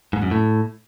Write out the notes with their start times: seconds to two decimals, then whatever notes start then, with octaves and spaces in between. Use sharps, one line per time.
0.13 G#2
0.22 F#2
0.31 A2